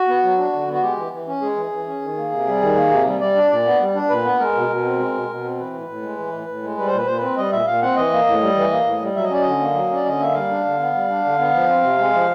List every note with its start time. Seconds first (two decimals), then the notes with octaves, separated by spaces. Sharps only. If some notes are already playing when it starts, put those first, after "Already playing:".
Already playing: F#4
0.08 B3
0.23 F#3
0.38 D4
0.53 D3
0.68 B3
0.73 F#4
0.82 G#3 G4
0.97 E3
1.12 E3
1.27 C#4
1.42 G#3 G#4
1.56 E3
1.72 E3
1.86 C#4
2.02 D#3
2.17 A#3
2.32 C3
2.47 G3
2.61 D#3
2.76 A#3
2.91 C3
3.06 G3
3.20 G3 D5
3.35 D4
3.50 A#2 D5
3.65 B3
3.80 G3
3.95 D4
4.10 A#2 B4
4.24 B3
4.39 G#3 A#4
4.55 B2
4.69 B2
4.84 C4
4.99 G#3
5.14 B2
5.29 B2
5.44 C4
5.59 E3 B4
5.74 A2
5.88 A2
6.03 G#3
6.18 E3
6.33 A2
6.48 A2
6.63 G#3
6.77 G3 B4
6.87 C5
6.92 A#2 B4
7.07 A#2 C5
7.18 C4 B4
7.37 G3 D#5
7.52 A#2 E5
7.66 A#2 F5
7.82 C4 F#5
7.96 E3 D#5
8.11 A#3
8.26 A2
8.41 G3
8.56 E3
8.71 A#3
8.85 A2
9.01 G3
9.16 F#3 E5
9.24 D#5
9.30 C#4 D5
9.42 D3 D#5
9.60 A#3
9.75 F#3
9.90 C#4 D5
10.05 D3 D#5
10.19 A#3 E5
10.34 G3 F5
10.49 D4
10.65 D3
10.79 B3
10.94 G3
11.09 D4
11.24 D3
11.39 B3
11.54 F3
11.69 C4
11.83 C3
11.98 G#3
12.13 F3